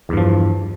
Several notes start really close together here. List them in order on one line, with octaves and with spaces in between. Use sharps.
E2 G2 F3